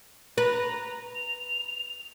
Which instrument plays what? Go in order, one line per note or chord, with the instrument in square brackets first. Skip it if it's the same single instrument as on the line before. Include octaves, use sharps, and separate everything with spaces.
[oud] B4 [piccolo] A#5
[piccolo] F7